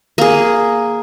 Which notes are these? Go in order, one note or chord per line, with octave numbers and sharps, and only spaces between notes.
A#3 G#4